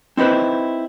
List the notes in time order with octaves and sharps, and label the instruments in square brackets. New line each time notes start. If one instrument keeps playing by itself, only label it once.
[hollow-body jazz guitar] C4 D#4 E4 B4 C5